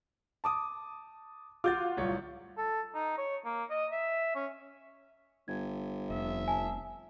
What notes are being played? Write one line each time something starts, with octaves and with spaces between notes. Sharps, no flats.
A5 D6 D#6
F4 F#4 D6 G6 A6
D1 C2 C#5
A4
D#4
C#5
A#3
D#5
E5
C#4
G1 G#6
F1 E5
G#5 A5